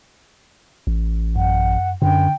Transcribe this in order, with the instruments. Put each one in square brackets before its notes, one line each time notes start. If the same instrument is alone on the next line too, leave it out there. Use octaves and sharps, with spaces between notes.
[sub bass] A1
[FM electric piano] F#2 [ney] F#5
[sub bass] F#2 [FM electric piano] D3 [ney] G5